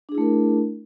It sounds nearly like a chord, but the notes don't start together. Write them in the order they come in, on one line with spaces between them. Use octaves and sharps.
D4 G#4 E4 A3 A#4